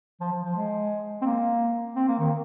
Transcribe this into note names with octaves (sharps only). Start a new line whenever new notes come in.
F3
F3
F3
G#3
C4
A#3
C4
A#3
D#3